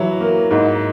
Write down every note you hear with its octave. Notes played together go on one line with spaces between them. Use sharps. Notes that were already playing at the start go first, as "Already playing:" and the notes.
Already playing: E3 F#3 E4
A#3
G#2